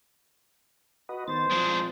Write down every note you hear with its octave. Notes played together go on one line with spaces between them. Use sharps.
F#4 B4 D#5
D#3 B3 C5 A6
F3 G#3 C4 D4